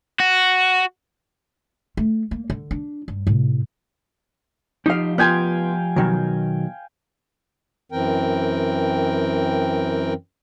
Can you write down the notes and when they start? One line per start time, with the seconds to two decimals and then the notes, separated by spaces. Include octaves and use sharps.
0.20 F#4
1.97 A3
2.31 A#3
2.50 D3
2.71 D4
3.08 G2
3.27 A2 C3
4.86 F3 D#4 G4 F5
5.18 B3 F4 F5 G5 G#5
5.96 B2 D#3 F#3
7.92 F#2 E3 C4 A#4 G5